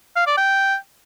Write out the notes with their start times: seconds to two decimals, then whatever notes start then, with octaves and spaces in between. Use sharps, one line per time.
0.16 F5
0.27 D5
0.37 G5